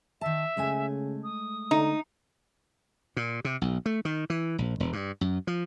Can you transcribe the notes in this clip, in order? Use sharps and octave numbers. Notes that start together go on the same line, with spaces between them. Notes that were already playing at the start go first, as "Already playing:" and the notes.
D#3 E5 A5
C#3 G#3 A3 G#5
D#6
D3 D#4
A#2
C3
B1
A3
D#3
E3
A#1
E1
G2
F#2
F3